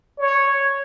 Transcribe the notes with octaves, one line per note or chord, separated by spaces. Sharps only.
C#5